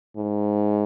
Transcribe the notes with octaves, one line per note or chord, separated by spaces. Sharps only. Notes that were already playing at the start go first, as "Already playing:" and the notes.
G#2